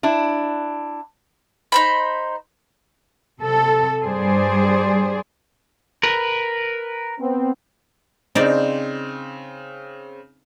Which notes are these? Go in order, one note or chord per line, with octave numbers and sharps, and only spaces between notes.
D4 E4
D#4 C5 B5
C3 A4
G2 G3 G#4 C5 D5
A#4 B4
B3 C4
C#3 C4 D#4 C5 D5